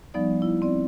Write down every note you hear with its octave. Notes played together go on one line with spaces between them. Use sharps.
F3 G3 B3 D#4 D5
E4
C4 D5